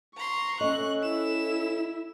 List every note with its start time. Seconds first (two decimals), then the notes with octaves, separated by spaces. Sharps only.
0.17 A#5 C6 C#6
0.61 C#4 A4 D#5 F#6
1.03 E4 E7